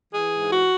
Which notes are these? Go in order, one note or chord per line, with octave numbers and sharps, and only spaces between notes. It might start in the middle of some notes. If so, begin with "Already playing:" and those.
E3 G#4
G#2
F#4